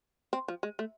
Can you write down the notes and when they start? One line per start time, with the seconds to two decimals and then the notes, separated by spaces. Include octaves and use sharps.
0.33 C4
0.48 F3
0.63 G#3
0.79 A3